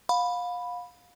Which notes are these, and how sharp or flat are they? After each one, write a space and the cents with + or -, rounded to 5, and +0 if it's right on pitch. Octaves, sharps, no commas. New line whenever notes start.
F5 +30 B5 +0